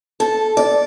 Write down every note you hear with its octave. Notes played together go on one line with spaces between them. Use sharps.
A4
D5